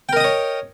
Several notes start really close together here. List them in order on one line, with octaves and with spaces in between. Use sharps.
G5 A#4 D#5 D#6 C#5